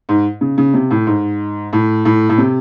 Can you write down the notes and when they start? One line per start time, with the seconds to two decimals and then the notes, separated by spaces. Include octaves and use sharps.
0.09 G#2
0.41 C#3
0.58 C#3
0.74 C3
0.91 A2
1.07 G#2
1.73 A2
2.05 A2
2.29 A2
2.38 C3